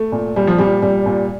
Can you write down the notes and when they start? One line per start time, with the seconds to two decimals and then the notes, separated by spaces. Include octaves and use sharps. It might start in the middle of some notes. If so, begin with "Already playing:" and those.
Already playing: A3
0.12 A#2
0.36 A#2 G3
0.47 F3
0.58 A#2 G3
0.82 A#2 G3
1.06 A#2